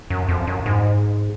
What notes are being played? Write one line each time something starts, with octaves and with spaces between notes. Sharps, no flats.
F#2
F2
F#2
G#2